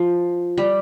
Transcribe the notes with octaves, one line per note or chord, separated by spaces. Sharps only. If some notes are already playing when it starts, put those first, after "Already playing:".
Already playing: F3
G3